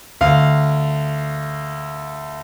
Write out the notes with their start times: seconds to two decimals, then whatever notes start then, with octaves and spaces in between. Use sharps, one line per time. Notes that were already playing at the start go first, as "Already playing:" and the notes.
0.21 D2 F5